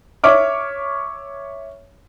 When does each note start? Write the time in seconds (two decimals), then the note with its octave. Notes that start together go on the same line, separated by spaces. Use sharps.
0.24 C#5 E5 C#6 D6 F6